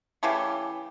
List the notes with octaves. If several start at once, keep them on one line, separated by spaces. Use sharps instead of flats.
C#3 E3 A3 G4